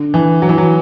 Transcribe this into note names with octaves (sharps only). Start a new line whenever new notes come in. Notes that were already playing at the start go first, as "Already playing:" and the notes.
Already playing: D3
E3
F#3
E3
F#3